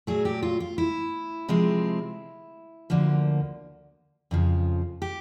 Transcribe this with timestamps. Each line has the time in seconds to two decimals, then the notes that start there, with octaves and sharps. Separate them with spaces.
0.07 A#2 F#3 A3 G#4
0.25 G4
0.43 F4
0.60 F4
0.78 E4
1.49 C3 F3 G#3 C4
2.90 D2 D3 F3 A#3
4.31 F2 C#3 F3
5.02 G4